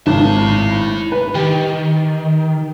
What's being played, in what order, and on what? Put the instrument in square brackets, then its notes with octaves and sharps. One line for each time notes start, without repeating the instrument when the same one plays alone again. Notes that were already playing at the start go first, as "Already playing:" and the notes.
[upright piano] G#1 [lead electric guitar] E4 A5
[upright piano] B4
[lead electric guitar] D#3 [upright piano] G4